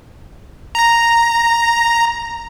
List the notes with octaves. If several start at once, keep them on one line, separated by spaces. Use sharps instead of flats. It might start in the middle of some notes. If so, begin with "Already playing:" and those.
A#5 A#6